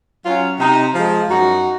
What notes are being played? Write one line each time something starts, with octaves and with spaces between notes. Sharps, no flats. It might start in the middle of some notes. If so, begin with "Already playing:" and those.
F#3 C#4 F4
C3 D#4
F3 G#3
F#2 D#4 F#4